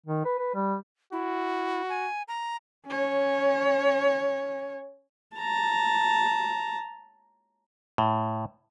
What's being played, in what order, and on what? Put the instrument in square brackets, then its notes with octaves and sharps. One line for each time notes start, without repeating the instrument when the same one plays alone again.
[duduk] D#3
B4
B4
G3
[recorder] E4 [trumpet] F#4
[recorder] G#5
A#5
[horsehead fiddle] C#4 C#5
[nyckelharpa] A5 A#5
[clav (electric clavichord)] A2